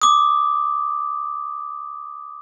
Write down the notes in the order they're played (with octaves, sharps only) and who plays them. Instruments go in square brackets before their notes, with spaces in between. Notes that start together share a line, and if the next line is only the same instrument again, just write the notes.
[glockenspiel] D6 D#6